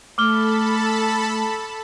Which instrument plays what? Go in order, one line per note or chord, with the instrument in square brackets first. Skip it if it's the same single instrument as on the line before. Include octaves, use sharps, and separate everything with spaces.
[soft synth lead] A3 [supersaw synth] A4 A5 B5 [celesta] D6 F6 G7